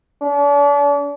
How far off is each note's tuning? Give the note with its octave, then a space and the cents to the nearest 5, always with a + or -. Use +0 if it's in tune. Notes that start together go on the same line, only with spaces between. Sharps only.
D4 -40